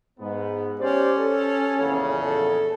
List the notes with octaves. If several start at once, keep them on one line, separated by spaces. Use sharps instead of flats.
G#2 B3
C#4 G4 C5 D5
A4
A#1 E2 C#3
A4